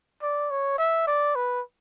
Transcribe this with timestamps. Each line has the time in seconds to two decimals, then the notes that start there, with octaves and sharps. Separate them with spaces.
0.23 D5
0.50 C#5
0.78 E5
1.07 D5
1.35 B4